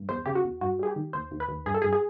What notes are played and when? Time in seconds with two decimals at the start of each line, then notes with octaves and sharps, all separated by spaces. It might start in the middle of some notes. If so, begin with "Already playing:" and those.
Already playing: G2
0.09 E2 C5
0.26 C#3 G4
0.35 F#4
0.44 E2
0.61 G2 F#4
0.79 G3 G#4
0.87 G4
0.96 D#3
1.13 D#2 C5
1.31 D#2
1.40 B4
1.48 D#2
1.66 G2 G#4
1.74 A4
1.82 G#4
1.84 G2
1.93 G#4